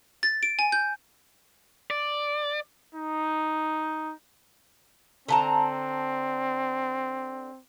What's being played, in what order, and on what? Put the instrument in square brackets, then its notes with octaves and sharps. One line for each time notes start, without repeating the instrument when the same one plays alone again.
[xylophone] A6
D7
G#5
G6
[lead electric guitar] D5
[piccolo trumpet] D#4
[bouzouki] D3 A5 A#5 [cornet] C4